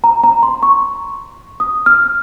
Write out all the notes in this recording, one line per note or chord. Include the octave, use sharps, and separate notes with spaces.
A#5
A#5
C6
C#6
D#6
F6